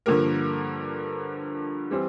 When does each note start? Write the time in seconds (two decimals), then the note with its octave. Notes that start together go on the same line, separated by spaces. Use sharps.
0.06 G2 D3 F3 A#3 A#4
1.91 E3 G3 C4